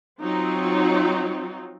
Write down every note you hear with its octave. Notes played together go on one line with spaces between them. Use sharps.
F#3 C4 D#4 F4